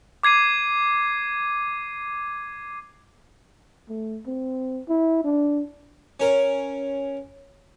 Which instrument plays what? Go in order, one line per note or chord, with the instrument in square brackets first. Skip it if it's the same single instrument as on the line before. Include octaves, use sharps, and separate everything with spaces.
[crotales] D6 G#6 C7 D#7
[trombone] A3
C4
E4
D4
[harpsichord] C#4 A#4